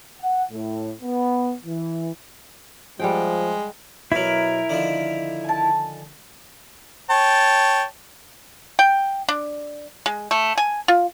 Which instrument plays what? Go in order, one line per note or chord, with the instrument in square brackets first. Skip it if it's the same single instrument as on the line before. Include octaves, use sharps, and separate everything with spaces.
[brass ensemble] F#5
A2
B3
E3
[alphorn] F3 [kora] G3 F#5 G5 [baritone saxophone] G#3
[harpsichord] B2 F#3 [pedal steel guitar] E4 A#4
[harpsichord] D3 D#3 F3
[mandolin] G#5 A5
[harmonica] C#5 G5 A5
[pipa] G5
D4
G#3
A3
G#5
F4